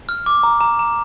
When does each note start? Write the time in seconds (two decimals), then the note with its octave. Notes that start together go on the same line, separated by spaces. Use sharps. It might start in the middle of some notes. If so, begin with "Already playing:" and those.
0.09 F6
0.26 D6
0.43 A#5
0.61 A#5
0.79 A#5